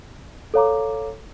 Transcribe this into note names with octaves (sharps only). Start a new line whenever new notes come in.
A4 C#5 F5 A#5 D6